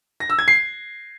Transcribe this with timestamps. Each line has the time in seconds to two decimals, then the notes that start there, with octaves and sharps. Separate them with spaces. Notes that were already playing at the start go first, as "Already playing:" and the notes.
0.20 A#6
0.29 E6
0.39 G#6
0.48 C7